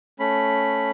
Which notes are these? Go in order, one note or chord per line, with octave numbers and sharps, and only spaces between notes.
A3 C#4 B5